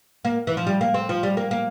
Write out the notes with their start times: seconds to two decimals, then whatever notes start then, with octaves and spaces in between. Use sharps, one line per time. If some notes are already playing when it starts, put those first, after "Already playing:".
0.25 A#3
0.47 E3
0.57 F3
0.67 G3
0.81 A#3
0.94 C4
1.09 F3
1.23 G3
1.37 A#3
1.51 A#3